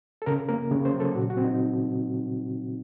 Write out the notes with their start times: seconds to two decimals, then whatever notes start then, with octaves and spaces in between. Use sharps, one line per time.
0.22 A4
0.26 C#3 A#4
0.49 A#3 A#4
0.71 C#3 C#5
0.85 C5
0.92 F#3
1.00 A4
1.15 A#2 F#4
1.30 F#4
1.37 C4
1.44 D#4